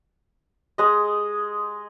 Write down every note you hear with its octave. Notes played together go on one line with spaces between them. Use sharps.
G#3 D#5